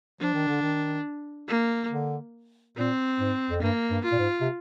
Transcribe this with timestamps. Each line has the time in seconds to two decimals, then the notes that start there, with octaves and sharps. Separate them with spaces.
0.20 F3 D4
0.33 D#3
0.48 D3
0.61 D#3
1.48 A#3
1.91 D3
2.77 A#2 C4
3.20 G#2
3.50 F2
3.62 G2 A#3
3.91 G2
4.05 F4
4.12 A#2
4.19 G#2
4.41 C3